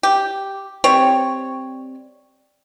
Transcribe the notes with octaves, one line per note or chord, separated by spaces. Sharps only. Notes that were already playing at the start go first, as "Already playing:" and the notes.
G4
G3 C4 C#5